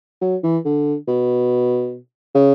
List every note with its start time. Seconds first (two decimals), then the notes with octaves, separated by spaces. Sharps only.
0.21 F#3
0.43 E3
0.65 D3
1.08 B2
2.34 C#3